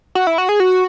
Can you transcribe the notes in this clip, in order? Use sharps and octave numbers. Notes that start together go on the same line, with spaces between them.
F#4
E4
F#4
G#4
F#4